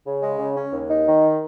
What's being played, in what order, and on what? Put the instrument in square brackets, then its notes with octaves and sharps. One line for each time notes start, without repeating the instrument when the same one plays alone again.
[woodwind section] C#3
G#3
C#3
C#4
D#2
D#4
D#3